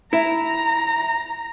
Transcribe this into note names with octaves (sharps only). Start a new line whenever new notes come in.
E4 A#5